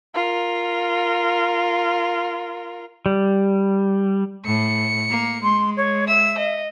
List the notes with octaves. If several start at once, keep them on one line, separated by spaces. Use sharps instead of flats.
F4 A#4
G3
A2 C#7
A#3
G#3 C6
C#5
E5 E6
D#5